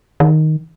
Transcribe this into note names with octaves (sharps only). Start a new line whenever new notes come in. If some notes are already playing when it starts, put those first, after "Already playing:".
D#3